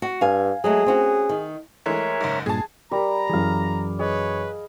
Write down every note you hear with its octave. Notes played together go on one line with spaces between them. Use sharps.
F#4
G2 F5 G#5
F#3 G#3 A3 G#4
C4 C#4 F#4
D#3
E3 G#3 A3 A#4 C#5 E5
F#1 G#2
G2 A#2 G#4 A5
G3 G4 A#4 D5 A#5 B5
F#2 E3 G#4 F5
G#4 B4 C#5 D#5